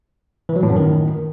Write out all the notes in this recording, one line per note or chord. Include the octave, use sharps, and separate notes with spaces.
E3
F#3
A2
F#2
D#3